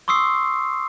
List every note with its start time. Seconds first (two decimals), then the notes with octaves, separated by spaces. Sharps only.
0.08 C6 C#6 D#6 E6 C7